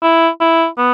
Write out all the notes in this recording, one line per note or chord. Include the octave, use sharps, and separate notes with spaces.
E4
E4
B3